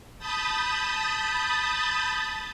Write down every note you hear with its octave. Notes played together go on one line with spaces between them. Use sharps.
A5 B5 D#6 G6 A6